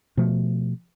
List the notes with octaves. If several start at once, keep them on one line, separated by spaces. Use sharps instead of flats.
B2 F3 A3